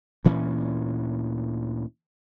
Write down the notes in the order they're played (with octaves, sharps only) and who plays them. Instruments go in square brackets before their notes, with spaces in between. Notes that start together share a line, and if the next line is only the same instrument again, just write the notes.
[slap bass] D2 A#2 E3 C#4